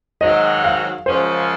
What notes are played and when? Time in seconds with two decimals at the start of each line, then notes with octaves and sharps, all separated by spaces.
0.21 G#2 D#3 F#3 D#5
0.64 F5
1.06 F#2 C#3 F3 G#3 C#4 C5